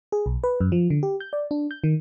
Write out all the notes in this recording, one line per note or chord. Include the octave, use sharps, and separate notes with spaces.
G#4
B1
B4
F#2
F3
D3
G4
G6
D5
D4
G6
D#3